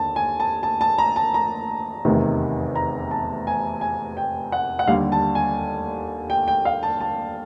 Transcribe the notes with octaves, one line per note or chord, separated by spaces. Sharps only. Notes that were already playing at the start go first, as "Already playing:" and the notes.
Already playing: D#2 D3 A5
G#5
A5
A5
A5
A#5
A5
A#5
F1 E2 C3 D#3
A#5
A5
G#5
G#5
G5
F#5
F#5
D#2 D3 G3 F5
A5
G#5
G5
G5
F5
A5
A5